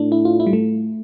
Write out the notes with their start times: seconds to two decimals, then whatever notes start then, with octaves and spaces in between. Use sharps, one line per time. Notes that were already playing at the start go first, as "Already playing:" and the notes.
Already playing: A2 D4
0.12 E4
0.25 F4
0.40 E4
0.47 G3
0.53 A3